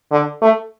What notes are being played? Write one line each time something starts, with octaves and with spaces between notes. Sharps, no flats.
D3
A3